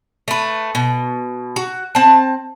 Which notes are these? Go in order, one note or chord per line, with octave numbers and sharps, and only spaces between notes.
A3 B4
B2
F#4
C4 A5